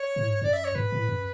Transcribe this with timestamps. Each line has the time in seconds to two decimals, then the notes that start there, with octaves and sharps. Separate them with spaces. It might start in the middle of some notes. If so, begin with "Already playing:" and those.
Already playing: C#5
0.16 A2
0.29 G#2
0.42 F#2 D5
0.53 E5
0.64 C#5
0.75 G#2 B4
0.92 A2
1.09 F#2